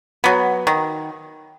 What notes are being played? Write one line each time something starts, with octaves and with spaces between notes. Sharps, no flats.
F#3 B3
D#3